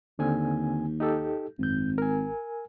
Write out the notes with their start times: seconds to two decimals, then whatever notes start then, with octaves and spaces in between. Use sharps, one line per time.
0.19 D#2 D3 C4 G#5
1.00 D#4 G4 A4
1.59 G#1 F#2 G6
1.98 A#4 G#5